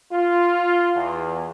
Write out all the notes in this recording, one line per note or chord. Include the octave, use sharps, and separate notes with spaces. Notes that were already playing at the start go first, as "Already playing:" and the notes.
F4
E2